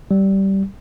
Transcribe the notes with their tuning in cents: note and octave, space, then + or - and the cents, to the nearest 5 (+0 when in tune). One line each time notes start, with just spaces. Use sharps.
G3 -15